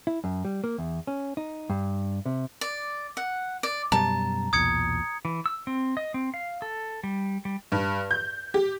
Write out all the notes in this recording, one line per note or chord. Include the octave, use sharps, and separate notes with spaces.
E4
F#2
G3
A#3
E2
C#4
D#4
G2
C3
D5
F#5
D5
F#2 B2 G3 A5 A#5
B1 E2 A#2 D#6 G#6 C#7
E3
E6
C4
D#5
C4
F5
A4
G3
G3
G2
G6
G4